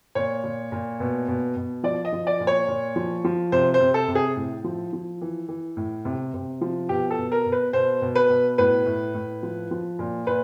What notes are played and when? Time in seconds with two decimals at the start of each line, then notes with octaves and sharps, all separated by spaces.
0.15 A#2 C#5
0.44 A#2
0.72 A#2
1.00 B2
1.28 B2
1.57 B2
1.83 F3 D5
2.05 D#5
2.13 F3
2.27 D5
2.40 A#2
2.47 C#5
2.68 A#2
2.96 F3
3.24 F3
3.52 C3 C5
3.74 C5
3.80 C3
3.94 A4
4.08 C3
4.15 G#4
4.36 A2
4.64 F3
4.93 F3
5.22 E3
5.49 E3
5.77 A2
6.05 C3
6.34 C3
6.61 F3
6.89 B2 G4
7.11 A4
7.18 B2
7.32 A#4
7.46 B2
7.52 B4
7.73 B2 C5
8.02 B2
8.15 B4
8.30 B2
8.58 A2 B4
8.86 A2
9.15 A2
9.43 F3
9.71 F3
9.99 A#2
10.27 A#2 B4